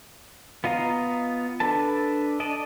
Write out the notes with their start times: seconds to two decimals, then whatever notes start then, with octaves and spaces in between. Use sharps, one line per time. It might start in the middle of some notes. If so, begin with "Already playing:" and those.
0.64 B3 F4 D#5 F5 A#5
1.60 D4 A4 B4 A5
2.40 D5 D#5 A5